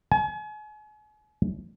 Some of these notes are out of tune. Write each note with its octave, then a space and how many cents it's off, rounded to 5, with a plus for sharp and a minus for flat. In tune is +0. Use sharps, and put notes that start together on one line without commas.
G#5 +40